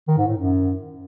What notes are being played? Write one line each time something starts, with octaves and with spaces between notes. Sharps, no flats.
D#3
G#2
A2
F#2